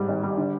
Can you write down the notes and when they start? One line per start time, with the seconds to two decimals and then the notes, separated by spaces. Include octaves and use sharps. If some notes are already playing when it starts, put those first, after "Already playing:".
Already playing: G#2 G3
0.08 G#1
0.23 G3
0.37 D3